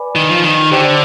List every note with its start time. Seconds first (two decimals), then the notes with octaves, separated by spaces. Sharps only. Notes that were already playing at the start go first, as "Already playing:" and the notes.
Already playing: B4 D5 G#5 B5 D6
0.15 D#3
0.29 F3
0.44 D#3
0.71 D3 G4 C5 G5 D6